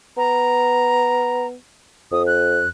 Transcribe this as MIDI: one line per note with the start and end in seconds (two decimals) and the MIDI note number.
0.18 1.54 59
0.18 1.47 82
2.12 2.67 41
2.12 2.23 87
2.27 2.69 90